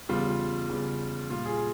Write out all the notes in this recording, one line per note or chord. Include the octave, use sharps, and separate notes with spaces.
E2 C#3 G3 F4
E2 C#3 G3
A#2 G3 F4
G#4